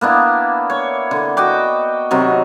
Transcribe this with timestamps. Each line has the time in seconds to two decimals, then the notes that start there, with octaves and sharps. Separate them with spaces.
0.01 A#3 B3 D4 E4
0.70 C#5
1.11 D3
1.37 F#4 D#5 G5 D6
2.11 C3 D#3 F#3